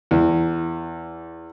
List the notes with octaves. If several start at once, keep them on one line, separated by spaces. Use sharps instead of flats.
E2